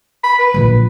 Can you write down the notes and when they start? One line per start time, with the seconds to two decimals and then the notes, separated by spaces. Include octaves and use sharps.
0.24 B5
0.39 B4
0.54 A#1 F#3